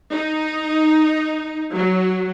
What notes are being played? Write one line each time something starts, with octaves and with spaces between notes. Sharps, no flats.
D#4
F#3